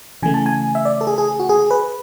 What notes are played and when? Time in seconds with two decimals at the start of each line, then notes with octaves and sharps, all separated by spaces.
0.22 C#3 E3 A3 G#5
0.34 A5
0.46 G#5
0.75 E5
0.85 D5
1.01 A4
1.07 G#4
1.18 G#4
1.39 F#4
1.49 G#4
1.71 B4